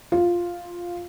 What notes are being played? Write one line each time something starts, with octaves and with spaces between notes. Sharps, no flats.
F4